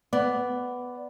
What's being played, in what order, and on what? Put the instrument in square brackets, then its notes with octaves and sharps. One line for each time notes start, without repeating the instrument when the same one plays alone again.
[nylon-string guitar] B3 [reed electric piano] D5